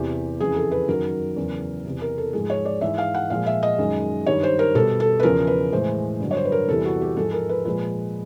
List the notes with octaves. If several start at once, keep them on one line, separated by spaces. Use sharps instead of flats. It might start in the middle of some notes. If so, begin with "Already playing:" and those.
Already playing: E2 C3 E3 G4
F2 C#3 E3 G#4
A4
B4
F#2 D#3 F#3 A#4
E2 C#3 F#3
E2 C3 E3
A#4
A4
G#2 F3 G#3 G#4
C#5
D5
G#2 E3 G#3 E5
F5
F#5
A#2 F3 G#3 F5
E5
D#5
F#2 D#3 G#3
G2 D#3 G3 C#5
C5
A#4
B2 G3 A4
A4
B4
E2 C#3 F3 A#4
B4
A2 E3 G#3 C5
G2 D3 F#3
C#5
C5
B4
A#4
E2 C3 E3 G3 A4
F#4
G4
G#2 F3 G#3 A4
A#4
B4
A#2 F3 G#3 B4